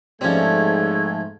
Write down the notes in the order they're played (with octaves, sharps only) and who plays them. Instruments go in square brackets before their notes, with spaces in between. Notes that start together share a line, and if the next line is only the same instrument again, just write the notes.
[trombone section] G#2 A3 [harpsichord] F3 C4 [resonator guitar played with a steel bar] G3 C#4 [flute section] G#6